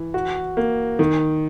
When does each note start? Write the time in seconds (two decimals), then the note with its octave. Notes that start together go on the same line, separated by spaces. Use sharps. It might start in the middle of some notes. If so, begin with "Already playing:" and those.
Already playing: E3
0.14 F#4
0.57 A#3
0.99 D#3